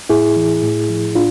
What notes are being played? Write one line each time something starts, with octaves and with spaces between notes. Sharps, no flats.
A2 E4 G#4
E3
A2
F3
A2 D4 F4